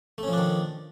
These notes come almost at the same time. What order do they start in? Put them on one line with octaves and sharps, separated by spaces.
A3 C#4 F3 D4 D#3